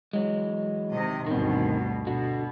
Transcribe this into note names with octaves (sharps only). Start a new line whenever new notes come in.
E3 F#3 G#3
C3 D#3 D#5
D2 G2 B2 D#3 C4
B2 D3 F#4